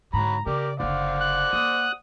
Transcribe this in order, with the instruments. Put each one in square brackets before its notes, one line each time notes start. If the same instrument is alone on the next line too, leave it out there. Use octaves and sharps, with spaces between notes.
[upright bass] G#2 D3 [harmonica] F#3 B5 [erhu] A#5
[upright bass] C#3 [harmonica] G4 A#4 [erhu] D5
[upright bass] F#1 D3 [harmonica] C5 D5 F#5 [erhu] F5
[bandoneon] F#6
[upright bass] A#3 [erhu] D#6